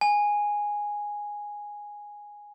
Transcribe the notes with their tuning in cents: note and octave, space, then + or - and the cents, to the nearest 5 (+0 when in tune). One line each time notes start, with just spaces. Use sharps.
G#5 -5